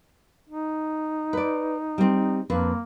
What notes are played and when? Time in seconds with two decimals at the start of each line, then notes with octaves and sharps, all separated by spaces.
0.49 D#4
1.33 B4 D5
1.98 G3 C4
2.50 F2 A#3 D4 B4